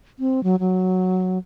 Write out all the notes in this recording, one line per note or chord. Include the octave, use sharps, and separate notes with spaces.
C4
F#3
F#3